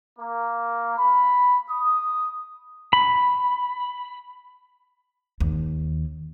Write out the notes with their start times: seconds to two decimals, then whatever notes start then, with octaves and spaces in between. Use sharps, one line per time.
0.19 A#3
0.98 B5
1.70 D#6
2.93 B5
5.40 D#2